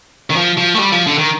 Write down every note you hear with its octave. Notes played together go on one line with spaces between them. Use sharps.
D#3
F3
F3
A3
G3
F3
D3
D#3